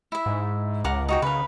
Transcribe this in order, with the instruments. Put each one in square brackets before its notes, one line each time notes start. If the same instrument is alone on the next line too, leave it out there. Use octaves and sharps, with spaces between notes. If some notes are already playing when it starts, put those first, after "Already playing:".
[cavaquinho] E4 E5
[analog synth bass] G#2
[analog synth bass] C#2 [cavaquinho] A#4 F#5 D6
[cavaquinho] D#4 F#4 G5
[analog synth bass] C#3 [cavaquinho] A#4 B4